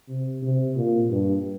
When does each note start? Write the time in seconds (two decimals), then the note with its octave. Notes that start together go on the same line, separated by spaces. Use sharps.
0.08 C3
0.43 C3
0.76 A#2
1.11 G2